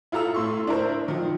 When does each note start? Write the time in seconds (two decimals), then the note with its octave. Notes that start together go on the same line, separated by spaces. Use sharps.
0.12 E4 F4 A4 A#5 E6
0.34 A2 C6 C#6
0.67 D4 E4 A#4 C5
1.08 D#3 F3